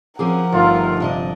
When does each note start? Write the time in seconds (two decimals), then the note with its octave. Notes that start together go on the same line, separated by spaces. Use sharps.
0.19 F3 C4 C#4 G#4 A#4 F#5 D6 D#6
0.52 G1 D3 D#3 A3 B3 F4
1.00 C3 F3 D4 D#5